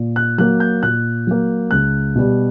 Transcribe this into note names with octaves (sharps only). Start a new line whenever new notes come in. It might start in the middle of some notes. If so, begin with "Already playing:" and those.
Already playing: A#2
F#6
F#3 A#3 F#6
G6
A#2 F#6
F#3 A#3
C#2 F#6
B2 G3